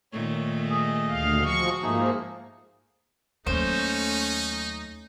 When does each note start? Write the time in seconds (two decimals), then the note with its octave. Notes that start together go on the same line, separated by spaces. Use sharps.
0.12 A#2 D#3 A3 C#5
0.70 G#4 D#5
1.09 D2 F5
1.44 F3 F#4 C#6
1.83 G#2 F3 A3 A#3 D#4 G#4
3.47 D#2 F#3 A3 C#4 D#4 C5